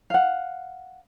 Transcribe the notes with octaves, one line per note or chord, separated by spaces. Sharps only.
F5 F#5